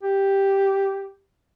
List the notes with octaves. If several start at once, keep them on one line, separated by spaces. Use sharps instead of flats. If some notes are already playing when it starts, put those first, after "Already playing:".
G4